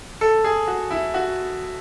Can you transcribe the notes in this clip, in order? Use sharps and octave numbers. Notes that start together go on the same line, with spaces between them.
A4
G#4
F#4
E4
F#4